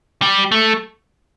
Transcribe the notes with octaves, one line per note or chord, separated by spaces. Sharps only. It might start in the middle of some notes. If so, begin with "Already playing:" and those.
G3
A3